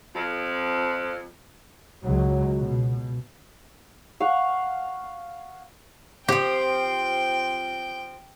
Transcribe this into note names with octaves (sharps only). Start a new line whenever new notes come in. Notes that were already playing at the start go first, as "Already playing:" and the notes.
F2
C#2 F#3
B2
F5 F#5 C#6
F3 C4 G4 G5